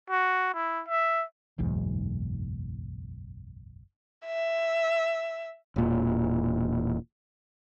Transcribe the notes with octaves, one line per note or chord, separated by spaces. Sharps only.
F#4
E4
E5
F#1 B1 E2 G#2
E5
E1 A#2